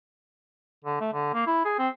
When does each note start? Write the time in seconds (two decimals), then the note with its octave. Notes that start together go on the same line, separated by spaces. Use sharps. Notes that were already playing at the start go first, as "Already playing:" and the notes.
0.84 D3
1.01 A3
1.13 D3
1.34 A#3
1.47 E4
1.65 G#4
1.79 C4